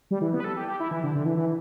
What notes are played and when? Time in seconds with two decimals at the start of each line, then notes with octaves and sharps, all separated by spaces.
0.11 G3
0.22 E3
0.33 B3
0.40 B4
0.44 A4
0.57 G4
0.68 G4
0.80 E4
0.91 E3
1.03 D3
1.15 D3
1.26 E3
1.37 E3